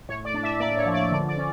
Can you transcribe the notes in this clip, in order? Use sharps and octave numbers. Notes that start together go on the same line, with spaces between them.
A2 C#5
D5
D4
E5
A#3 D5
C#5
F3
D5
D3 D5
D5
C#4